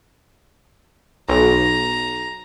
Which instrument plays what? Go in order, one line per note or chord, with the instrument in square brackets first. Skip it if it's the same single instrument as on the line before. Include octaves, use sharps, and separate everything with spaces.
[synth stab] B1 [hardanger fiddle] A#5